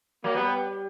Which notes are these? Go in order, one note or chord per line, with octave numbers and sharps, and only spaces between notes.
F#3 A#3
G3 B3